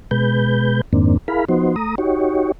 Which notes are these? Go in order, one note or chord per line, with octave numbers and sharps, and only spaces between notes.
B2 G#3 B4 G6
F2 G#2 D#3 A#3 C4 D4
E4 G#4 A#4 F5 B5
F3 B3 D#4 F#4 C5
A3 A#5 D#6
D#4 F#4 G4 C#5